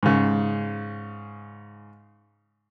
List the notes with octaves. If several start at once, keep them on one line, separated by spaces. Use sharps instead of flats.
G#2 C#3